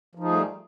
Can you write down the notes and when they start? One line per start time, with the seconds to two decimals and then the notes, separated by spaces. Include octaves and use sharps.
0.15 F3
0.19 D#4
0.24 G#4
0.28 A3
0.32 G3